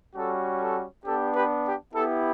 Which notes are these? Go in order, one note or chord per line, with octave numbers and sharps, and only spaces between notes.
G3 C#4 F#4 A4
A4
B3 D4 G4 A4
G4 B4
G4
B3 E4 G4 A4